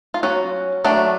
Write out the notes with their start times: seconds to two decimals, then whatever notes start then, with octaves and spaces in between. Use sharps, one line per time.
0.14 F4
0.23 F#3 C#4 F#4
0.84 F#3 A3 D4